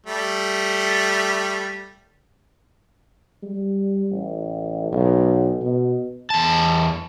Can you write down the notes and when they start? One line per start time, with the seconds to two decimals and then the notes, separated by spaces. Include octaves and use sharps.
0.07 G3 A3
3.43 G3
4.12 A1
4.92 B1
5.61 B2
6.30 E2 A5